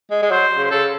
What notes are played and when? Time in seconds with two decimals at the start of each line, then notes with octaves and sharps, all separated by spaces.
0.11 G#3
0.23 G#3
0.31 F#3 C5
0.58 C#3
0.64 C5
0.71 C#3 A4